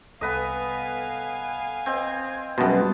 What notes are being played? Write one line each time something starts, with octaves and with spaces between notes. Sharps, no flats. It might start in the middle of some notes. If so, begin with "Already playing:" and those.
C2 B3 A4 B4 D#5 F5 G#5
C4 D#5 G6 G#6
F#2 B2 G3 G#3 B3 A5 C6